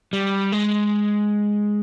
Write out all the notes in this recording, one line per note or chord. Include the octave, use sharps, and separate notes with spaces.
G3
G#3